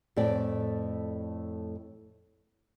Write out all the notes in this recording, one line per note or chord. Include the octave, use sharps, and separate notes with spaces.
F2 A2 A3 D5 G5